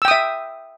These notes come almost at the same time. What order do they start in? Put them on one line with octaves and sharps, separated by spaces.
E6 G5 D#6 E5